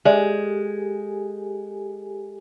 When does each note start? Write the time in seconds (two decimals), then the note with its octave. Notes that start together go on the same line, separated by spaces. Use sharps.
0.05 G#3 G4 A4 D5 E5 G#5